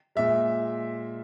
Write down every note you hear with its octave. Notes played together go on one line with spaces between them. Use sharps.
A#2 G#3 E5